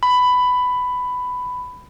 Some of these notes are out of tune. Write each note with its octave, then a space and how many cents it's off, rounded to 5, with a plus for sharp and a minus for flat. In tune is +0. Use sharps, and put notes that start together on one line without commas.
B5 +10